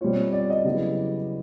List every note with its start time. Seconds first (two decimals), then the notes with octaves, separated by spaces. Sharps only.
0.01 B2 G3 C4 F4 C#5
0.33 D5
0.50 D#5
0.65 C#3 F#3 B3 E4 G4